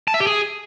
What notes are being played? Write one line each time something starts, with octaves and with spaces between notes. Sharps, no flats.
A5
E5
G4
G#4